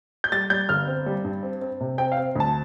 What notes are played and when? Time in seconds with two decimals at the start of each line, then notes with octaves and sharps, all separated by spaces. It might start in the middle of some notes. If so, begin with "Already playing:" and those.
0.24 G6
0.32 G3 A6
0.50 G3 G6
0.69 G1 F6
0.87 C4
1.06 G3
1.24 G2
1.43 C4
1.61 C4
1.80 C3
1.98 C4 G5
2.12 F5
2.17 C4
2.36 D2 A5